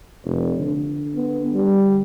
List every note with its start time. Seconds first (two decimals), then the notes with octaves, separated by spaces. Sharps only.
0.25 F1
0.60 D3
1.16 B3
1.54 G3